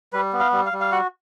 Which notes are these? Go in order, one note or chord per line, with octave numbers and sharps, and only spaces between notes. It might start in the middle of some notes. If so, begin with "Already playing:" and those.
G3 B4
B3
F5
G3
F5
G3
F5
F#4 F#5